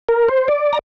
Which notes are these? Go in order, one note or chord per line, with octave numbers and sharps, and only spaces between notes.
A#4
C5
D5
A#5